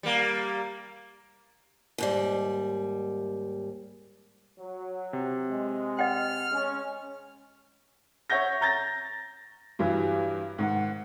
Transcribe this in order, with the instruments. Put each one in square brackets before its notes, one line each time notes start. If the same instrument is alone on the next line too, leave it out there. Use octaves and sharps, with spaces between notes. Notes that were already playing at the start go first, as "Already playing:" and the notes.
[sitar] G3 A#3
[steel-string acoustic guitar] D#2 G#2 G3
[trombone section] F#3
[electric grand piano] C3
[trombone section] G#3
[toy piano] D#5 F#5 G5 [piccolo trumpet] F6
[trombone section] G#3 C#4
[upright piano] C#5 E5 F#5 G6 A#6
A#5 G6 A6 A#6
G2 E3 F#3 G3
G#2 D#3 F#5